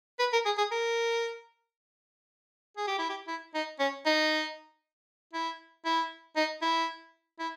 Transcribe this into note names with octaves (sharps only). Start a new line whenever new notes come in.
B4
A#4
G#4
G#4
A#4
G#4
G4
E4
G4
E4
D#4
C#4
D#4
E4
E4
D#4
E4
E4